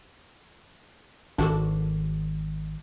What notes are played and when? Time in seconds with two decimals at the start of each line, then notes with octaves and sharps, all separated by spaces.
1.38 G#1 D4 F#4 A4